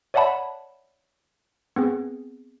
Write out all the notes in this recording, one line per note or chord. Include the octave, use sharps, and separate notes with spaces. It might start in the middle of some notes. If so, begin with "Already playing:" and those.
C#5 D5 E5 F#5 A5 B5
B3 C4 G#4